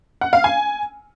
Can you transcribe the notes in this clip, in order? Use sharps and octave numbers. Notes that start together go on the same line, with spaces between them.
F#5
F5
G#5